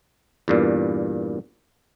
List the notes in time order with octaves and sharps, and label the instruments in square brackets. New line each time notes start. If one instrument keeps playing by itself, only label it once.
[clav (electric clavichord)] E2 G2 A#2